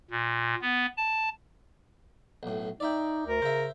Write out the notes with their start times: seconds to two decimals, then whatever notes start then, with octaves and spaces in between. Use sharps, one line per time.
0.11 A#2
0.62 B3
0.97 A5
2.43 B1 A2
2.80 D#4 D5 E5 G5
3.26 D2 A#4
3.42 C#3 C5 E5